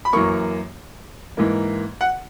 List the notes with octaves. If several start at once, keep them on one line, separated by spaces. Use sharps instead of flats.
B5
F#2 E3 A#3 C#6
G#2 E3 A#3
F#5